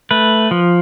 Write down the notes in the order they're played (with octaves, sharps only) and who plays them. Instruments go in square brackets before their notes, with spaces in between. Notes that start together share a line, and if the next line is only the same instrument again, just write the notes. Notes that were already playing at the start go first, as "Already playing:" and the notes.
[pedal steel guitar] A3 B4
F3